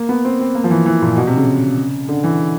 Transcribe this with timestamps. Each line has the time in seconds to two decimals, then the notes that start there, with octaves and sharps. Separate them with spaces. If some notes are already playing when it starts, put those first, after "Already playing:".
Already playing: A#3
0.09 B3
0.25 C4
0.40 C4
0.55 A#3
0.64 F3
0.70 E3
0.86 E3
1.02 A#2
1.16 B2
1.27 C3
1.37 C#3
2.09 D3
2.24 E3